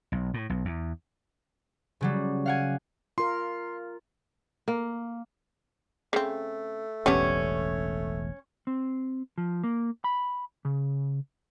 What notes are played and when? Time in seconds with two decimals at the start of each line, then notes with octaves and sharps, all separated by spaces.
0.12 B1
0.34 A2
0.50 B1
0.65 E2
2.01 C#3 F#3 G3
2.46 F5 F#5 G#5
3.18 F4 A#4 C6
4.68 A#3
6.13 C#3 A3 C4
7.06 E1 A1 G3 B3 C#4 D4
8.67 C4
9.38 F3
9.64 A#3
10.04 B5
10.65 C#3